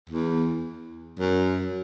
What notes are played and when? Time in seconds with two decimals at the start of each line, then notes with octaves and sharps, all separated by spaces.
0.10 E2
1.19 F#2